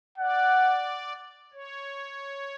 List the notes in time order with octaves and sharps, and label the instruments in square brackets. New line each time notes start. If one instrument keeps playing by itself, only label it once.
[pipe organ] D5 [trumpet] F#5
[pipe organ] C#5